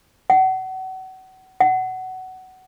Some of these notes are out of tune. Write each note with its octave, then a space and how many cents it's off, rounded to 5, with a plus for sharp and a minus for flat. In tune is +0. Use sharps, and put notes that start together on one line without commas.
F#5 +30
F#5 +15